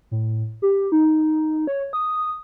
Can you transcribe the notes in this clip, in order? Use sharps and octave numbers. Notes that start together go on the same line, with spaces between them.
A2
G4
D#4
C#5
D#6